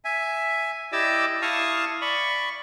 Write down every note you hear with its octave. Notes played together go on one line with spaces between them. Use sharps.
E5 G#5
E4 G4 D5 D#5 D6 E6
E4 F5 A5 C#6 D#6 F6
D5 B5 C#6